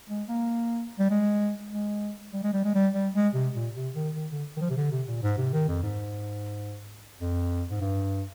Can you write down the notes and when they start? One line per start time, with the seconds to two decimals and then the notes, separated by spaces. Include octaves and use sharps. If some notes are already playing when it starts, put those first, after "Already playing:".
0.09 G#3
0.29 A#3
0.99 G3
1.10 G#3
1.72 G#3
2.33 G3
2.43 G#3
2.53 G3
2.64 G#3
2.75 G3
2.93 G3
3.14 G#3
3.34 C3
3.54 A#2
3.75 C3
3.95 D#3
4.15 D#3
4.31 D3
4.57 D#3
4.61 F3
4.70 C3
4.77 D3
4.92 C3
5.07 A#2
5.22 G#2
5.38 C3
5.53 D#3
5.68 F2
5.83 G#2
7.20 F2
7.70 G#2
7.81 G2